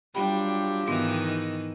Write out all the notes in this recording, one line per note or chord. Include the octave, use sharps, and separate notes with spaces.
F#3 G3 D4 F4 G4 G5 B5
G#2 D#3 E3 B3 D#4